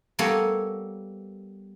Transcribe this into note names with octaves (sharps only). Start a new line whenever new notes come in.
G3 A#3 B3 A4 C#5